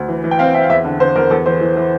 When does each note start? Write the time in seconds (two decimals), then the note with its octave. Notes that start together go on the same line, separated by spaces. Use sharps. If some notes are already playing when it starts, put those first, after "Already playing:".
Already playing: D2
0.09 E3
0.24 E3
0.31 G5
0.39 C4 F5
0.54 C4 E5
0.63 F5
0.70 E2 E5
0.85 D3
1.00 D3 C5
1.15 E2 A#4
1.30 E2 A4
1.46 E3 C5
1.61 E3
1.77 E3